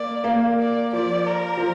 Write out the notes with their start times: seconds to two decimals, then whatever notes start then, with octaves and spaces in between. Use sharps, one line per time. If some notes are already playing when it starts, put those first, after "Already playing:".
Already playing: A#3 D5
0.24 A#3
0.60 D5
0.93 F3 D5
1.27 A#4
1.57 F3